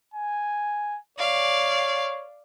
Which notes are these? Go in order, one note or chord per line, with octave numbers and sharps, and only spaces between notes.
G#5
C#5 D5 F5